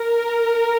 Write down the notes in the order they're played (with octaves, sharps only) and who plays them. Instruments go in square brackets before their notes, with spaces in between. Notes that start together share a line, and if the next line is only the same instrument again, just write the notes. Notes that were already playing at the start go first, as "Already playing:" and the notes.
Already playing: [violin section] A#4